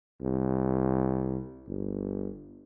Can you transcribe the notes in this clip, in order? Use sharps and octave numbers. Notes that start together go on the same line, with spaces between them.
C2
G1